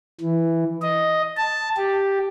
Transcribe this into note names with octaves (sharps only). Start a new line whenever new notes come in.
E3
D#5
A5
G4